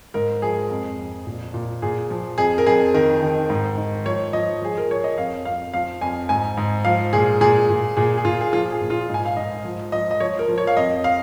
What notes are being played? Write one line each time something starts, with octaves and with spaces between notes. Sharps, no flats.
G#2 A#4
F3 G#4
F2
F2
A#2
A#2
A#2 G#4
F3
F2 G#4
A#4
F2 G#4
D#3 A#4
D#3
G#2
D#3
F3 C#5
F3 D#5
F3 G#4
A#4
F3 C#5
D#5
F2 F5
F2 F5
F3 F5
F2 G#5
G#2 G#5
G#2
F3 F5
A#2 G#4
A#2 G#4
A#2
A#2 G#4
G#4
A#2 F4
G#4
F3 F4
G#4
A#2
F4
G#2
G#5
F5
G#2 D#5
F3
F3 D#5
D#5
F3 C#5
A#4
F3
C#5
F5
F2 D#5
F5